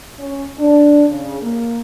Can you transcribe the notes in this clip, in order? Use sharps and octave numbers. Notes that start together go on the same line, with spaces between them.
C#4
D4
C#3
A#3